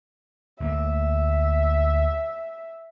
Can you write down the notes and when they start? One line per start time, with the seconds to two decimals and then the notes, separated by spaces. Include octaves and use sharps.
0.60 D2 A3 A#3 E5